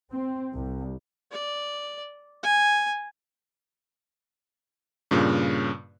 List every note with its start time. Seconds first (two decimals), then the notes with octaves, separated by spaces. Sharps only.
0.11 C4
0.54 C2
1.32 D5
2.44 G#5
5.11 G2 A#2 C#3